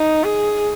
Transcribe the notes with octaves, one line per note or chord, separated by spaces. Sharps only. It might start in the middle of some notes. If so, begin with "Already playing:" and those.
Already playing: D#4
G#4